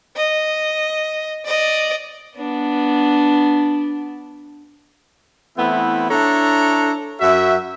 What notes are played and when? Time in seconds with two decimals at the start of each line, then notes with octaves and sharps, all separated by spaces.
0.16 D#5
1.45 D5 D#5
2.36 B3 D4
5.57 E3 A3 B3 C4 E4
6.09 D4 E4 A4 C#5 A#5
7.20 F#2 F#4 E5